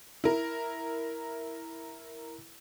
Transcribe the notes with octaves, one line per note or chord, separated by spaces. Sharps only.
E4 A#4